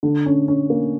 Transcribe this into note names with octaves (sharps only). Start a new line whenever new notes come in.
D3
C#4
C#4
A#3